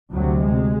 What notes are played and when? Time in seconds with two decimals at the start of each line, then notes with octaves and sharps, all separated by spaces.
0.12 D2 C3 F#3
0.40 G#3